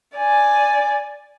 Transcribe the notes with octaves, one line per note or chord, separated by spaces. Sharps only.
D5 G#5